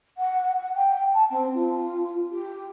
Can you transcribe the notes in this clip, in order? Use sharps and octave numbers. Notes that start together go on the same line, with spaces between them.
F#5
F#5
G5
A5
C4
F4
G4